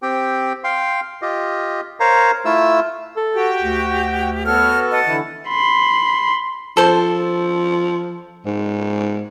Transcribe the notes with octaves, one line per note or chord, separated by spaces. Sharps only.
C4 G4 G5
F5 G5 C6
F4 G4 D#5
A#4 C5 C#5 F5 A#5
A3 E4 F4 E6
A4
F#4 G4 G5
D2
B3 F#4 A4 C#5 F6
D#5 F#5 A5
D3 E3 E4
B5 C6
F3 A4 C5
G#2